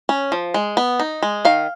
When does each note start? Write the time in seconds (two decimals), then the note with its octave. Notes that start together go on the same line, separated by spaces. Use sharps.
0.09 C#4
0.32 F3
0.54 G#3
0.77 B3
1.00 D#4
1.22 G#3
1.45 D#3 F5